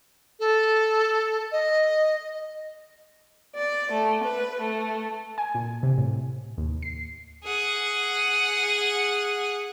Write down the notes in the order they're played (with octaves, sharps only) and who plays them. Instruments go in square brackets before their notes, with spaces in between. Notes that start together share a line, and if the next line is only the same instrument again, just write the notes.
[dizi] A4
D#5
[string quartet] D5
A3
B4
A3
[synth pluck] G#5
A#2
C3
A2
D#2
C7
[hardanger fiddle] G#4 F#5